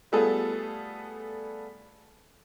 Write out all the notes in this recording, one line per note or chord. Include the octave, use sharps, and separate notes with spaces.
G3 A3 B3 F4 G#4 A4